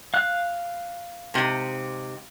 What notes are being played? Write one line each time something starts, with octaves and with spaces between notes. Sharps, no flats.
F5 F#6
G#2 C3